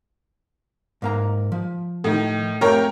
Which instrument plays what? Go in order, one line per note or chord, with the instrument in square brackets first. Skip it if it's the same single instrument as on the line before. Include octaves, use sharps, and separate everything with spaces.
[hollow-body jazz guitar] G#2 A#3 A#5
F3
[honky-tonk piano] A2 D#3
[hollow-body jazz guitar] A3 C4 G4 [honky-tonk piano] A#4 C#5 G5